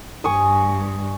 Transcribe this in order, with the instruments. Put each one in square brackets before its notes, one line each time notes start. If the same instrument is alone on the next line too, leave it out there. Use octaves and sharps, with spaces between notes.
[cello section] G2 [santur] G#5 C#6 D#6